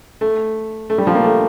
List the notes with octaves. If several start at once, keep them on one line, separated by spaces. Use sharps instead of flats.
A3
A3
G3
F3
A#3
A3